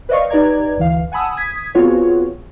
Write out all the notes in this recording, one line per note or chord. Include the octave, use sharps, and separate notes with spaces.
B4 C5 D5 D#5 F5 C#6
D#4 G4 B4 D5 A#5 G#6
D2 E3 F5
F#5 G#5 A5 B5 D#6 E6
D#6 G#6 B6
B3 C4 F4 F#4 G#4 C#5